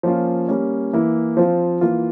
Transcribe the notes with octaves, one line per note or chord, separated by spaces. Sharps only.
F3 A#3 C#4 F4
G3 A#3 C#4
E3 A#3 E4
F3 C4 F4
E3 A#3 F4